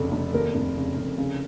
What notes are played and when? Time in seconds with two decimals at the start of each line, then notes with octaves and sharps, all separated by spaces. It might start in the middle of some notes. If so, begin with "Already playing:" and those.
Already playing: F1 F2 C#3 A4
0.12 F1
0.34 D#2 A#4
0.55 F1
0.76 C#3
0.97 F1
1.18 C#3